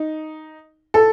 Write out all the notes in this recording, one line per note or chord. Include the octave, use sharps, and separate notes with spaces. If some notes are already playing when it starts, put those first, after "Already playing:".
Already playing: D#4
A4